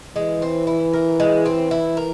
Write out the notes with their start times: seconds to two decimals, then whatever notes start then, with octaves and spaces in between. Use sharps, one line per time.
0.16 E3 G#3
0.42 C4
0.67 E4
0.93 A#4
1.20 G#3
1.46 C4
1.71 E4
1.97 A#4